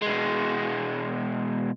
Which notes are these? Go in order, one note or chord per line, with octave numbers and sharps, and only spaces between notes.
B2 G#3